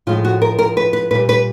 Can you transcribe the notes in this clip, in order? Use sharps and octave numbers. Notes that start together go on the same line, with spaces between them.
A2 F3 G#3 F4
F#4
A#4
A#4
B4
B4
A#2 G3 B4
B4